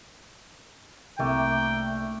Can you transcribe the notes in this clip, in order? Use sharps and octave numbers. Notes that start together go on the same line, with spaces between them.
C2 A3 A#3 D4 G5